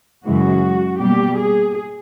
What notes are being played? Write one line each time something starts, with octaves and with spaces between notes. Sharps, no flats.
F#2 C#3 E3 G#3 F#4
B2 G3 A#3 G4
G#4